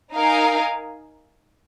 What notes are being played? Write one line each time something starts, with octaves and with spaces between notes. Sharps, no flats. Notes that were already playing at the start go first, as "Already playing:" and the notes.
D#4 A#4 F5 G#5